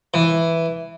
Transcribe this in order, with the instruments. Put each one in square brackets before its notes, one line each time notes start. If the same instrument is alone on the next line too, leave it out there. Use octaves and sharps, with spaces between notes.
[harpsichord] E3